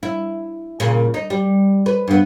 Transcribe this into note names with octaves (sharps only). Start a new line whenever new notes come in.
E4
A#2 C#3
D#4
G3
B4
G2 B3